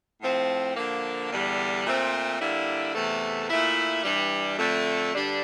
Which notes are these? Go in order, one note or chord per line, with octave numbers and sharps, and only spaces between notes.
A2 F3 C4
D3 F3 A#3
E2 D3 G3
A#2 A3 C4
D3 G3 A#3 E4
E2 C3 E3 A3
A#2 A3 E4
G2 E3 G3
F2 D3 A3
G2 D3 G3 D4